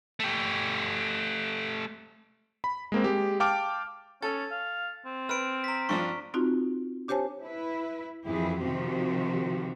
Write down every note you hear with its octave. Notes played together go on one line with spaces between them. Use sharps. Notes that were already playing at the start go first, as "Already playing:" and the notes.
A3 G4
B5
G#3 A#3 C4
G#3 G4
F5 G5 A5 D6 F6 D7
C#4 A4 A6
F5
C4
B4 F6 D7
A#5 B6
G2 F3 D4 C#6
C4 D#4 F4 F#4
D4 G4 C5 C#5 G#5 A5
E4 B4
F2 E3 E4 G4 G#4
C3 D#3 F3 C4 F#4 G4